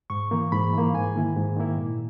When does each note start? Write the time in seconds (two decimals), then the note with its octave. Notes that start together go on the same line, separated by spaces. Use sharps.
0.10 G#2 C#6
0.31 E3 A#3
0.52 G#2 B5
0.73 E3 A#3
0.94 G#2 G#5
1.15 D#3 A#3 E4
1.36 G#2
1.56 D#3 A#3 E4
1.77 A#2